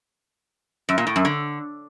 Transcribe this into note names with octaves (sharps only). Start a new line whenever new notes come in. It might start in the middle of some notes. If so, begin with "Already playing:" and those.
F#2
A#2
A2
F#2
D3